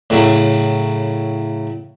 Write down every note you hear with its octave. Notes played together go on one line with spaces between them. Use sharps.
A2 C#3 F#3